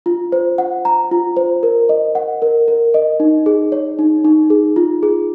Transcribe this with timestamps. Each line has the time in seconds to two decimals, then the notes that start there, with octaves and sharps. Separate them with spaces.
0.06 F4
0.32 C5
0.58 F#5
0.85 A#5
1.11 F4
1.37 C5
1.63 A#4
1.89 D#5
2.15 F#5
2.42 A#4
2.68 A#4
2.94 D#5
3.20 D#4
3.46 G#4
3.72 C#5
3.99 D#4
4.25 D#4
4.50 G#4
4.76 F4
5.03 G#4